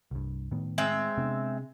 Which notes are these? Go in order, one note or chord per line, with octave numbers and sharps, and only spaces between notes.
C2 G2
A2 D#3 B3
G#3 C4 E5
C3 B3 D4